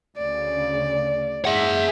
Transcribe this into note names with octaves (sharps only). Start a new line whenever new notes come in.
D2 C#3 D5
G#2 G#4 E5 F#5